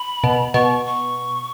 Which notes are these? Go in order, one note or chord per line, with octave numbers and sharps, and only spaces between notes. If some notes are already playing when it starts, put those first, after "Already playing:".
Already playing: B5
B2
B2 C#6
C#6